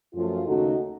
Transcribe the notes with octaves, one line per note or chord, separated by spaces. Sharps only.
F#2 F3 A3 F4
D#2 C#3 A3 C#4 D#4 F#4